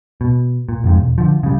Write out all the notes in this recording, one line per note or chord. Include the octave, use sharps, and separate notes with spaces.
B2
A#2
F1 F2 G#2
E1
D3 F3
C#3 G3